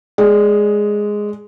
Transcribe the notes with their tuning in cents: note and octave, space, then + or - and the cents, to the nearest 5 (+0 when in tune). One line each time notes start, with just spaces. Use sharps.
G#3 +0 D5 +0